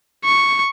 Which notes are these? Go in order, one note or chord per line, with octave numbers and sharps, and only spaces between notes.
C#6